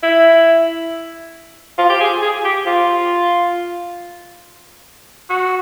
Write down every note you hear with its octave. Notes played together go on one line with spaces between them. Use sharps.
E4
F4
G4
G#4
G#4
G4
F4
F#4